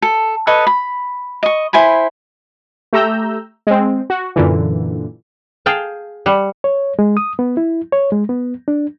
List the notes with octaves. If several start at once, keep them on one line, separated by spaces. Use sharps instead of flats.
A4
A4 B4 C#5 D#5
B5
D#5 C#6
E4 C5 G#5 B5
A3 G4 A#5 E6 G6
G#3 C4
F#4
F#2 A#2 D3 E3
G#4 F5 G5 A5
G3 F#5
C#5
G#3
D#6
B3
E4
C#5
G#3
B3
D4